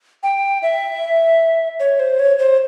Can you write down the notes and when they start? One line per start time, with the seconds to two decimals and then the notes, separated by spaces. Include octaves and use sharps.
0.23 G5
0.62 E5
1.80 C#5
2.00 C5
2.19 C#5
2.39 C5